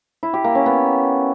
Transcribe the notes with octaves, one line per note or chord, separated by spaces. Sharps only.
E4
G4
A#3
C#4
B3